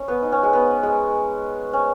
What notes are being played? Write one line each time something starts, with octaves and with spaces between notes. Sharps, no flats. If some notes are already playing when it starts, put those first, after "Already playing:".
Already playing: C#4
B3
D#4
C#4
G#3
B3
G#3
C#4